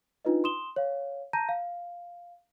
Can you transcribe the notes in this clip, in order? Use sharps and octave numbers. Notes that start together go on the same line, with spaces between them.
D4 D#4 F4 B4 D#5
C6 D#6 E7 G7
C#5 F5
A5 A#5 G6 A#6 D#7
F5